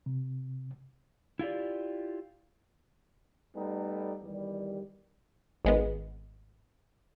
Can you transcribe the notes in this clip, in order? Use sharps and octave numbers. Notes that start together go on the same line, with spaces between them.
C3
E4 F4 G4 D5
G3 A3 B3 D#4 A4
E2 D#3 G3
G#1 G#3 B3